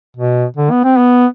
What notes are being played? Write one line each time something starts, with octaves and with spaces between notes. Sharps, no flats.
B2
D3
B3
C4
B3